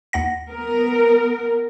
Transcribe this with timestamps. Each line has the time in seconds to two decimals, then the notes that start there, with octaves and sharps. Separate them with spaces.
0.13 D#2 F#5 A#6
0.48 B3 A#4